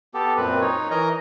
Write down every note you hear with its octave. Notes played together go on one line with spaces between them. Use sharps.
B3 G4 A4
F#2 A#2 C4 B4
D#4 C#5
E3 A#4 D#5 A#5